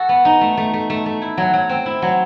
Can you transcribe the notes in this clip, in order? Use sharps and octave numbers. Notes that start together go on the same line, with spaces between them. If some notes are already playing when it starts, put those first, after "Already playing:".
Already playing: F#4 A4
B3
D#4
A3
A3
A3
A3
A3
E4
F#3
F#3
C4
E4
F#3